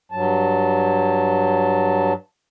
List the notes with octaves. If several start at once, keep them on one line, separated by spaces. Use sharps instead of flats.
G2 F#3 A5